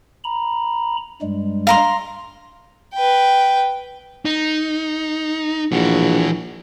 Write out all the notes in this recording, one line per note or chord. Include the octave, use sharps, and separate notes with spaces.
A#5 B5
G2 G3 G#3
F5 A#5 C6
B4 G5
D#4
A#1 E3 F#4